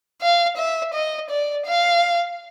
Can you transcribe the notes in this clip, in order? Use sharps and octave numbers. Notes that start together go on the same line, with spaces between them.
F5
E5
D#5
D5
F5